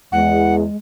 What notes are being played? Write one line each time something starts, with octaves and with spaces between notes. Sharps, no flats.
E2 G#3 F#5